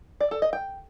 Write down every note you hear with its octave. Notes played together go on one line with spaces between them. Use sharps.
D5
A4
D#5
G5